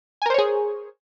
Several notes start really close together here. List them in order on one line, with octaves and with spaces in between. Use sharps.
G#5 A#4 C5 C#5 G#4